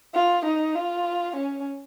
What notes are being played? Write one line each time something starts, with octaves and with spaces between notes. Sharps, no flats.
F4
D#4
F4
C#4